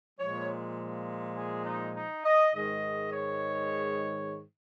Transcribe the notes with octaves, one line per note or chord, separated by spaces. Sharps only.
A#2 F3 G#3 C#5
G#4
D#4
D#4
D#5
G#2 D#3 G#3 D#5
C#5